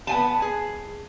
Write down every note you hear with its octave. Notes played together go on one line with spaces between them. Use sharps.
B3 G#5 A5
G#4